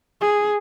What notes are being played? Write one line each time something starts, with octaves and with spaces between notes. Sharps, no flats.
G#4